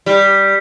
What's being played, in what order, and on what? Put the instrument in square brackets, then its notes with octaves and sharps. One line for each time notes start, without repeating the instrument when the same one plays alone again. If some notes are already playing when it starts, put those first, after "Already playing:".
[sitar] G3